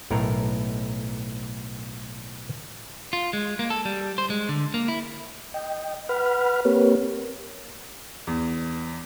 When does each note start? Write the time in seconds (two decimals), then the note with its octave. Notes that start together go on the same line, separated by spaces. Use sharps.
0.10 B1 A2 A3 A#4 A#5
3.13 F4
3.33 G#3
3.59 A#3
3.70 A4
3.85 G3
4.18 C5
4.30 G#3
4.49 D3
4.74 A#3
4.88 E4
5.54 D#5 G5
6.09 B4 F#5 B5 F6
6.65 A#3 C4 G4 A#4 B4 C#5
8.27 E2